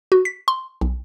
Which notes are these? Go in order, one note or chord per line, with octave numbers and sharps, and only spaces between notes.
F#4
B6
C6
B1